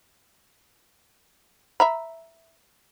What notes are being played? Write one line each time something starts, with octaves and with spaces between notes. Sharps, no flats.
E5 A#5 B5